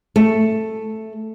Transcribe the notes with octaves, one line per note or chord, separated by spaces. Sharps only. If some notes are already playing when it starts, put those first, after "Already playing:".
A3